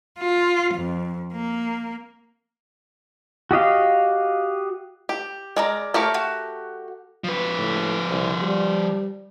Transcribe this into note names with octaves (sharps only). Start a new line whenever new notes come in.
F4
F2
A#3
F#4 G4 D#5 F5
G4
G#3 A#4 D5 A#5
A3 G4 A#4 C#5 D6 F6
F#4
F3 B4
A2
C2
G3